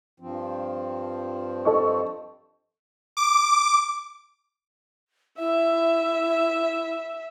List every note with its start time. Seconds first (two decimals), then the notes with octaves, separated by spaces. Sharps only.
0.20 G2 F3 C4
1.65 A4 D#5 C#6
3.17 D6
5.39 E4 E5